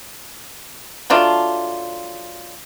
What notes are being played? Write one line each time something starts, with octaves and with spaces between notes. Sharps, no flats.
F#3 A3 D4 F4